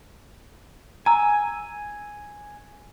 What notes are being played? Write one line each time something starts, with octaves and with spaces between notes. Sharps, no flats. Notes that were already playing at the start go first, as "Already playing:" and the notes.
G#5 A#5 E6